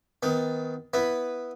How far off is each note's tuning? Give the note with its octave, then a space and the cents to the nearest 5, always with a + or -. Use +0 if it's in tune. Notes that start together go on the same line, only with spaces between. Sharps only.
D#3 +25 B3 +20
B3 +0 E4 +0 B4 +0